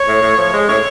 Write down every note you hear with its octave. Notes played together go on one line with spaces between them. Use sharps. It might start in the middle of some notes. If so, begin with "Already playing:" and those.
Already playing: C#5
A2
A2
F3
G#3
A2 C#5